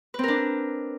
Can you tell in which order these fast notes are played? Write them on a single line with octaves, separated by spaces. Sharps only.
B4 C4 A#4 D4